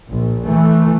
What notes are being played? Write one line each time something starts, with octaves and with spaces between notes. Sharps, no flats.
A#1
E3 A3